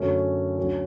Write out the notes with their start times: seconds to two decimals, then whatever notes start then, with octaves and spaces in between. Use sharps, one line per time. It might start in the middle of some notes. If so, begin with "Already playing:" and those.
Already playing: F#2 D3 F#3 A3 C#4
0.57 D2 D3 F#3 C#4